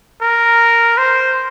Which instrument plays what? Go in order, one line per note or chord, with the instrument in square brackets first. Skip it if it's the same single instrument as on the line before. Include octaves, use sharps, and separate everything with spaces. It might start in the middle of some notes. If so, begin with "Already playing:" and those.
[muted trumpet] A#4
C5